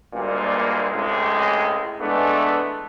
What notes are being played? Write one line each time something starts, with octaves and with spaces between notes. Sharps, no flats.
D2 G2 A#2 G#3 A#3
C#2 A2 C3 G#3
E3 G#3 A3 B3 D4